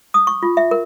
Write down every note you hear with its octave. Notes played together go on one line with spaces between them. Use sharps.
D#6
C#6
F4
E5
A#4